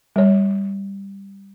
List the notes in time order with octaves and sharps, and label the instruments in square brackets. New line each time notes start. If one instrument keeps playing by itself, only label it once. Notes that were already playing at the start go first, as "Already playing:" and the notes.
[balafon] G3 C#5